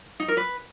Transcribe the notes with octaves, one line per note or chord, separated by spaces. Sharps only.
D#4
A#4
B4